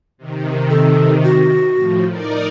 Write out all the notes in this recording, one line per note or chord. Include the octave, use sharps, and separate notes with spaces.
C3 D#3
A4
F#4
A2 F3
D#4 A#4 D5